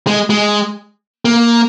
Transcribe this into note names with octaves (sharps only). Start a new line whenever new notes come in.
G#3
G#3
A#3